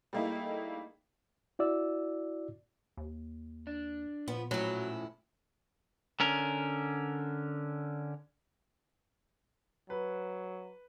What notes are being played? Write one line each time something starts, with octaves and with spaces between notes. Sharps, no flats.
G3 A3 A#3 D#4 E4 G#4
E4 F#4 D5 E6
D#2
D4
A#2 F3 B3
A2 F3 F#3 C#4 E4
D3 C#4 A#4
F#3 B4